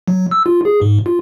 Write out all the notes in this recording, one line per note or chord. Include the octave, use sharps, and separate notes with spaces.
F#3
E6
F4
G#4
G#2
F4